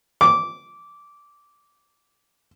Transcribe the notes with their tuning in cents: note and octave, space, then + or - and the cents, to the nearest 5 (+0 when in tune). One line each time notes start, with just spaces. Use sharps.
D6 -15